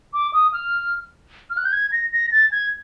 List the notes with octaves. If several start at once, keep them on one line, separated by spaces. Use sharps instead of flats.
D6
D#6
F6
F6
F#6
G6
G#6
A#6
A#6
A6
G#6